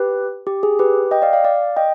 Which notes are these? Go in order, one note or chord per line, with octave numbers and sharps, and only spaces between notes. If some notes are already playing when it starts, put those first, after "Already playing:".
Already playing: G4 B4
G4
G#4
G4 B4
D#5 G5
D5 F5
D5 F5
D5 F5
D#5 G5